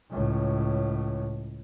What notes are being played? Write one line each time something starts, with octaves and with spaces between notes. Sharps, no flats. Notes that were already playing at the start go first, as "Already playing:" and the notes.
C#2 A2